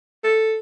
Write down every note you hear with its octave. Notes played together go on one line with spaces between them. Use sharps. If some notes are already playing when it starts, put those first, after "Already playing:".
A4